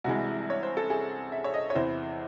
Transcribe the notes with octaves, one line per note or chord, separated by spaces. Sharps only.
C2 C3 E3 G#3 F#4
C#5
C5
A4
G#4
E5
C#5
D#5
C#5
E2 C3 E3 C5